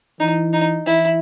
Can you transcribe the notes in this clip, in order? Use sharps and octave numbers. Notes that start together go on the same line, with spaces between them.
E3 D#4
D#4
E3 E4